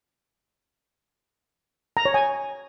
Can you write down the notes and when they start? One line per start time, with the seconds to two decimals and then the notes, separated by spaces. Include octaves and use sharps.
1.97 A#5
2.05 C#5
2.14 G#5